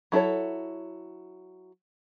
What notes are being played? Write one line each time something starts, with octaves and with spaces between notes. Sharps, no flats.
F#3 E4 A4 C#5